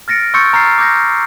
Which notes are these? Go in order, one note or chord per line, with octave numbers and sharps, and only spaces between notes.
F6 A6 A#6 C#7 D7
C6 C#6 E6 G6 A6 C#7
A#5 F6 A6 C7
D6 E6 G6 A#6